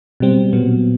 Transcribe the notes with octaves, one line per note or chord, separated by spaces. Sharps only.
B2 G3 C4
A#2 F#3 B3